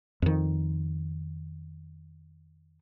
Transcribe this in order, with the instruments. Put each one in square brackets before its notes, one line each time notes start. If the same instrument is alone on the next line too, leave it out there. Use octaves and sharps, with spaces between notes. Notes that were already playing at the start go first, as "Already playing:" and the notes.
[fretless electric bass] F2 D#3